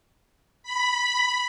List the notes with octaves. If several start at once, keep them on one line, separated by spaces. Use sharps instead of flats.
B5